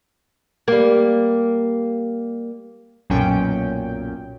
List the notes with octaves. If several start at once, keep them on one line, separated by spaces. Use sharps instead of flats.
G3 A#3
B1 F#2 A#2 C#4 G5